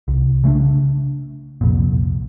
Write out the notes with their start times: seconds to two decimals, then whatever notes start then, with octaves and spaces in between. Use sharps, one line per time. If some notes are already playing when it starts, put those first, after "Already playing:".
0.08 C2
0.44 C#3 A3 C4 D4
1.61 C2 F2 A#2